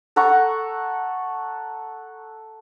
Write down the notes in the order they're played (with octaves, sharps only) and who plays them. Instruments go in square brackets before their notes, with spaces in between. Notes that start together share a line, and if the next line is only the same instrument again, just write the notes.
[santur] A4 F#5 A#5 C#6